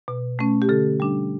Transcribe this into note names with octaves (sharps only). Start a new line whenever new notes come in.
B2
A3 C#4
G4
D3 A4
G3 D4